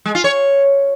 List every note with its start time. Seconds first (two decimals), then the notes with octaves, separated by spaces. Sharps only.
0.06 G#3
0.15 F4
0.24 C#5